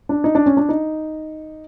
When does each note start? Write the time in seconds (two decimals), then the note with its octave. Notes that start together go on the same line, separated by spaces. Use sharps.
0.09 D4
0.24 D#4
0.35 D4
0.46 C#4
0.57 D4
0.69 D#4